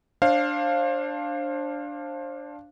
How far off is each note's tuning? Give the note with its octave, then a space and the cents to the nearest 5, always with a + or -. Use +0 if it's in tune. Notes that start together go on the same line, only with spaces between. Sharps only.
D4 +0 C5 +30 F5 +0